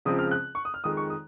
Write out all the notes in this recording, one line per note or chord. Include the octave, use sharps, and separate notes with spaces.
C#2 C#3 F3 G#3 C4 D#6
F6
F#6
C#6
D#6
F6
F2 D#3 G#3 D#6
C#6
D#6